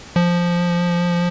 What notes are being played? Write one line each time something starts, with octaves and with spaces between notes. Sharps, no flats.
F3